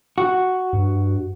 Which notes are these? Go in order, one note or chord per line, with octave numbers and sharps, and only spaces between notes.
F#4
G2